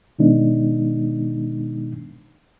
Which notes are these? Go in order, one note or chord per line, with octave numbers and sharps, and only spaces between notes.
B2 D#3 G#3 B3 D4 D#4